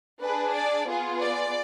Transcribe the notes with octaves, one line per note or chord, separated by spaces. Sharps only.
D4 G#4 B4
D5
B3 F4 G#4
D5